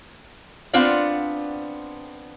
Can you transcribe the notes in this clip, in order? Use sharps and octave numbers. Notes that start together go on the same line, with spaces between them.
B3 C4 D4 F4 F5 F#5